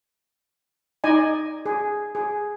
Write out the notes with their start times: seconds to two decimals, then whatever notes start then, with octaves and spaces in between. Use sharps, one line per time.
1.04 D#4 D5 D#5 G#5
1.66 G#4
2.15 G#4